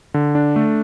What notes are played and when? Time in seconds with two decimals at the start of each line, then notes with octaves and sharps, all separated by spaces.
0.14 D3
0.35 D4
0.56 A3